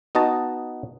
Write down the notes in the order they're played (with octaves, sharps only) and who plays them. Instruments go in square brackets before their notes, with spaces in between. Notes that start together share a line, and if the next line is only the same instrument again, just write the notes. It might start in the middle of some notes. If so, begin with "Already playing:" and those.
[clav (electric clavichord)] B3 D#4 F#4 D#5 A5